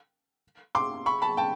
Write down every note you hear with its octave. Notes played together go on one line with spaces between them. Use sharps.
C6 D6
B5 C#6
A5 B5
G5 A5